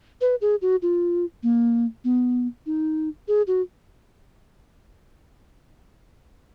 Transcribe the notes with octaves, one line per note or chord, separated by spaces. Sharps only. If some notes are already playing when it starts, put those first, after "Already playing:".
B4
G#4
F#4
F4
A#3
B3
D#4
G#4
F#4